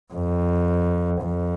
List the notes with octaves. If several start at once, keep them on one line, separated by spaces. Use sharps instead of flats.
F2
F2